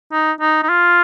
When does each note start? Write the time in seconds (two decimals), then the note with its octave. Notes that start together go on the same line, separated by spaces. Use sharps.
0.12 D#4
0.41 D#4
0.63 D#4
0.69 F4